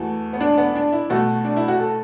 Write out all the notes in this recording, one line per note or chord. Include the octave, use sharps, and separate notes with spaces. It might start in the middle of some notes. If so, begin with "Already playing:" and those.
Already playing: E2 E3 A3 F#4
B3
D4
B3
D4
E4
B2 A3 F#4
D4
E4
F#4
A4